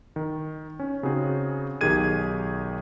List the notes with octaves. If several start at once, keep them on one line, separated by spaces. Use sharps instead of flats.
D#3
C#4
C#3 C4 D#4 F#4 G#4
B1 D#3 G4 G#4 G#6 D#7